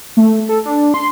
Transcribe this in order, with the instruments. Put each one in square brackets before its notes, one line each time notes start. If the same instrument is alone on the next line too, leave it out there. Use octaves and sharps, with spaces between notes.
[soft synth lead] A3
A4
D4
C6